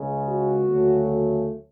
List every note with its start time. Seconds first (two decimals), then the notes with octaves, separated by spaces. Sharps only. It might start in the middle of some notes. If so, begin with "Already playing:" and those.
Already playing: C#2 C#3 G#3
0.27 F#4
0.68 D2 C#3 F#3 A3